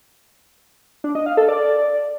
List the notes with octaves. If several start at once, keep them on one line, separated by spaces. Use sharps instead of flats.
D4
D#5
F5
A4
D5